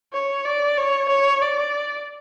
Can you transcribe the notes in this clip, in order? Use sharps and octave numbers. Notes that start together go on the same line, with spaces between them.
C#5
D5
C#5
C#5
D5